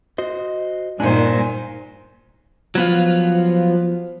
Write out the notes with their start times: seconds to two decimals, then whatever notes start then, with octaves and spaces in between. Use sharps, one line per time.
0.18 F#4 C5 D#5
1.00 G2 A#2 D#3 D4 D#4 C5 G#5
2.75 F3 F#3 B3 F4